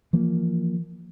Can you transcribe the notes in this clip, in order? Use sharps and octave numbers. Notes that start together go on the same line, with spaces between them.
E3 F3 A#3